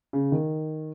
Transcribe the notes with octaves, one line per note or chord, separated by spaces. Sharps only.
C#3
D#3